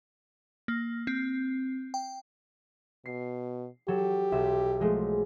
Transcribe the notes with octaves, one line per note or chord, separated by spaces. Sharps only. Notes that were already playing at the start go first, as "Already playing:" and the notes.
A#3
C4
G5
B2 C7
F#3 G4 A4
B1 E5
F3 G#3 A3